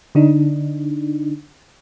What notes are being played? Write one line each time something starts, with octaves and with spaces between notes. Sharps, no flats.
D3 D4 D#4